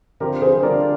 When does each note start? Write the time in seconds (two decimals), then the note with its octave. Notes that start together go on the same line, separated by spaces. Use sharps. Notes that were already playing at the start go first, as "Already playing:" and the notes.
0.20 D3 F3 C4 G4 A#4
0.42 G#4 C5
0.63 D3 G3 D4 F4 A#4 D5